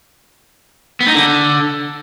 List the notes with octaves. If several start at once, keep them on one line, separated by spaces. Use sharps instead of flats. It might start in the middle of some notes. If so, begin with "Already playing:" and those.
B3
D#4
D3